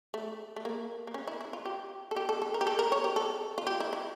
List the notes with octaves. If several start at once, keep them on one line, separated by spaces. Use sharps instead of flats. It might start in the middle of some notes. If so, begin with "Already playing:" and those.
A3
A3
A#3
A#3
C#4
E4
E4
F4
G4
A4
G4
A4
A4
A#4
G4
A4
A#4
C#5
G4
A4
F4
G4
E4
E4